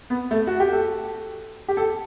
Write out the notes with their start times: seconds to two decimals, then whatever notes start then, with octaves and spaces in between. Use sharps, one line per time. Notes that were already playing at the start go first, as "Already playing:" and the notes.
0.10 B3
0.31 A3
0.47 F#4
0.60 G4
0.73 A4
1.68 G4
1.77 A4